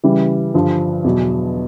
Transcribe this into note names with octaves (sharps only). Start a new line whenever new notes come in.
C#3 E3 G3
G2 D3 F3
E2 B2 F#3